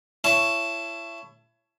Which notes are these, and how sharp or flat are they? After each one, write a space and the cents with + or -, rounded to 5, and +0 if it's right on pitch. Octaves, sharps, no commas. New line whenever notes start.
E4 +30 C#5 +5 A5 +0